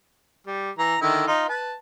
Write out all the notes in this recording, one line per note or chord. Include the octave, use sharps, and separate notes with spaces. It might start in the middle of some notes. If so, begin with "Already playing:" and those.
G3
E3 A#5
D3 D#3 E4
D#4 F4
B4 A5